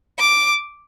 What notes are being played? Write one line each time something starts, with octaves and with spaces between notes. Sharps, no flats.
D6